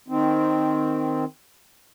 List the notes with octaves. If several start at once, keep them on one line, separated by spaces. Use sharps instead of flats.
D#3 C4